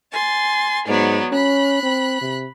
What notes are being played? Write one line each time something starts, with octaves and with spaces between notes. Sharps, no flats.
G#5 C6 A6
G#2 F#3 B3 D5
C#4 B5 F#6
C4
C3